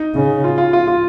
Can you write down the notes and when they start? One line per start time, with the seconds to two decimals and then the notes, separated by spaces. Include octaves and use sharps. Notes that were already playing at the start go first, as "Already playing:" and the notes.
Already playing: D#4
0.15 C#3
0.44 F4
0.58 F4
0.73 F4
0.88 F4